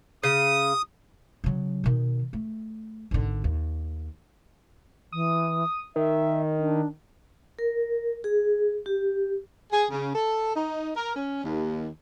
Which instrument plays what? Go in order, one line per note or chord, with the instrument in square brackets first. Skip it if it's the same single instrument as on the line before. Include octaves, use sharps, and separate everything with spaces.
[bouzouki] C#3 [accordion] D#6
[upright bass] C#3 F#3
B2 D#3
A3
G#1 D3
D#2
[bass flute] E3 [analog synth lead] D#6
[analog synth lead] D#3 [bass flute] E5
[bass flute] D4
[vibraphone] A#4
G#4
G4
[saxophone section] G#4
C#3
A4
D#4
A#4
C#4
D#2